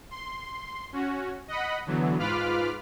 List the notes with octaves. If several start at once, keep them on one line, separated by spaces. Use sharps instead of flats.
C6
C#4 F#4
D#5 F#5 B5
D3 E3 F#3 B3
G#2 F4 B4 B5 D6 F6